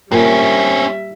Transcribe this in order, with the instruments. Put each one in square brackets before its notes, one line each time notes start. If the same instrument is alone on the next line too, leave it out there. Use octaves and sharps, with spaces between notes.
[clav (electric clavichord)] A#2 [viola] G3 E5 [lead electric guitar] C4 C#4 [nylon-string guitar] A#4